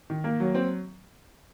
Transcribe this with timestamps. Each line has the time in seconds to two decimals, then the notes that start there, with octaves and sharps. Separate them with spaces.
0.10 D#3
0.24 A#3
0.40 F#3
0.55 C4